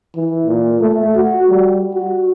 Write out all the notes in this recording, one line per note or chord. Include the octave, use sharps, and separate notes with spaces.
E3
A#2
A3
F#4
G3
F#4